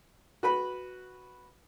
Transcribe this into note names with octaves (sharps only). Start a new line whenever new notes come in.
F#4 B4 B5